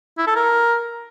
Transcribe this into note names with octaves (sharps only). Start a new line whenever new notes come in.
E4
A4
A#4